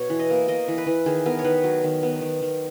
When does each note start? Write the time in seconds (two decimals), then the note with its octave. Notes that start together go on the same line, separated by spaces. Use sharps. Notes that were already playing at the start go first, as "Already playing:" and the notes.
Already playing: B2 C#5
0.10 E3
0.19 D#5
0.30 A#3
0.48 A#3 D#5
0.68 E3
0.78 B4
0.87 E3
1.06 D#3 G#4
1.26 B3 A#4
1.39 C#5
1.44 D#3 B4
1.64 F#3
1.84 D#3
2.03 B3
2.21 D#3
2.42 D#3